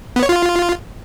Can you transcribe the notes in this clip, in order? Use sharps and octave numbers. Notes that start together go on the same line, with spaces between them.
B3
C#5
F4